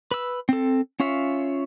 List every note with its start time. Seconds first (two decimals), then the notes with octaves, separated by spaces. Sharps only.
0.11 B4 E6
0.49 C4 A4
1.00 C#4 F4 C#5 E5 F5